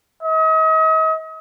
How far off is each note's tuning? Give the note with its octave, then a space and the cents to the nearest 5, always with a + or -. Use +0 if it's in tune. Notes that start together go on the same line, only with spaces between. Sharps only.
D#5 +40